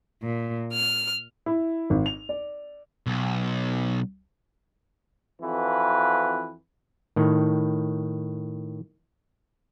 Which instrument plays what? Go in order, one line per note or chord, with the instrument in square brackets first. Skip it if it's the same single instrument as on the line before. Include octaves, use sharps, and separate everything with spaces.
[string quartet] A#2
F6
[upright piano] E4
G#1
F7
D5
[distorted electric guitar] B1
[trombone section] F2 E3 F#4 B4
[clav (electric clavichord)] A2 D#3